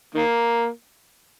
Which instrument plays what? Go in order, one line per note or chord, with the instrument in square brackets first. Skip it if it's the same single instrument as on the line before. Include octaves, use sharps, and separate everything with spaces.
[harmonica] D#3 A#3